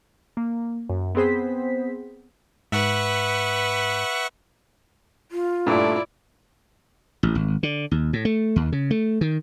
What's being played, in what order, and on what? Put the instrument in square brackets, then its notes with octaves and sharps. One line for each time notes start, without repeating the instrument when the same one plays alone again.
[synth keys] A#3
F#2
B3 C4 G#4 C5 B6
[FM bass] G#2 [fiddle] B4 [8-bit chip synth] E5 F#5 C#6
[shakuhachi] F4
[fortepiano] G2 A#2 [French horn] A3 [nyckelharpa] E4 D5
[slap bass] A1
G#1
D3
D#2
A2
A3
D#2
C#3
A3
D#3